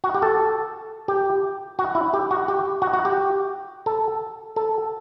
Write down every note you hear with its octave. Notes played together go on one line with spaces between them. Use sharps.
F#4
G4
A4
G4
F#4
E4
G4
F#4
G4
F#4
F#4
G4
A4
A4